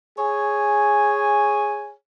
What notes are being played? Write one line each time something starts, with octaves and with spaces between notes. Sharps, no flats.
G#4 C#5 G#5